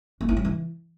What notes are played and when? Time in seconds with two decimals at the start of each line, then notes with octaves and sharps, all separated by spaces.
0.21 A#3
0.29 E4
0.37 F#3
0.45 E3